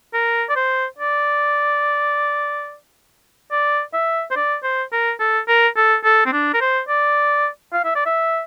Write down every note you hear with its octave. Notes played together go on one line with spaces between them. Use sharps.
A#4
D5
C5
D5
D5
E5
C5
D5
C5
A#4
A4
A#4
A4
A4
C4
D4
A#4
C5
D5
F5
E5
D5
E5